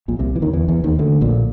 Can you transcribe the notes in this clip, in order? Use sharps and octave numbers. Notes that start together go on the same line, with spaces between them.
A#1 A#2
C2 C3
E3
D#2 D#3
E2 E3
E2 E3
D#2 D#3
D2 D3
A#1 A#2